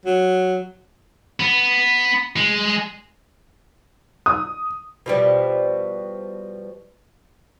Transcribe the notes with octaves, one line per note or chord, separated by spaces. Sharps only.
F#3
B3
G#3
D#6
B2 F3 G3